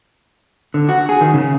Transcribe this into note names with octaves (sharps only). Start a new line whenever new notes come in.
D3
F#4
G#4
D#3
C#3